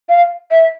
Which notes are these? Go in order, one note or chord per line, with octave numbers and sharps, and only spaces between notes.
F5
E5